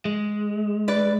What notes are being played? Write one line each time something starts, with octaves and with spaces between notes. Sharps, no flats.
G#3
B4 D5